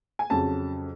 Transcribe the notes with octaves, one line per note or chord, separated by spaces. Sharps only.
G#5
F2 C#3 F#3 A5